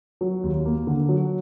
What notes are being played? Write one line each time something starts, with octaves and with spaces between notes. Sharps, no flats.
F#3
D#2
A#3
D3
F#3